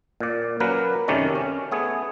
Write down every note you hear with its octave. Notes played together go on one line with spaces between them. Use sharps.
A#2 D5
F#3 A#3 C#4 A#4 B4
F#2 C3 D#3 A3 C#4 D5
C#4
A3 B3 G#4